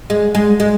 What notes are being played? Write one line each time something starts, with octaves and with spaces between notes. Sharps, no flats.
G#3
G#3
G#3